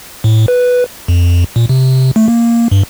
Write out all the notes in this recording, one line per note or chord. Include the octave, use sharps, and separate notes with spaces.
A2
B4
F2
A#2
C3
A3
A#3
G2